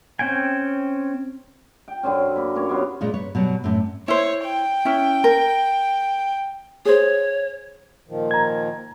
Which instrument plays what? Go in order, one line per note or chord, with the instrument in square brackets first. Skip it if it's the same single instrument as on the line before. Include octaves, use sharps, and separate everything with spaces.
[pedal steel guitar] C4 C#4 G5 G#5
[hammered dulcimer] G5
F#2 D3 C4 C#4
A#3 B4
A#3 C#4 C#5
C3 F#3 B3 F4
[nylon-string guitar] A#2 G#3 C#4 F4
B4 C#5
B2 F#3 G3
F#2 A2 C4
[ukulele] E4 C5 [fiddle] C#5
[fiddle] G5
[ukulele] C#4 E4
A#4
[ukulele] G#4 C5 [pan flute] C#5
[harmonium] A#2 D#3 F3
[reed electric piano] A#5 G#6